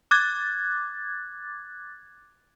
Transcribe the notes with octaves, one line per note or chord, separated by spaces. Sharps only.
D6 F#6 G#6 A6